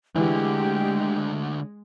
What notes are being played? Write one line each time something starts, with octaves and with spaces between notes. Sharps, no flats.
D2 D3 E3 G#3 G4